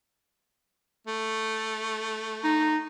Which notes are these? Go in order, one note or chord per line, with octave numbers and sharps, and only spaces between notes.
A3
D#4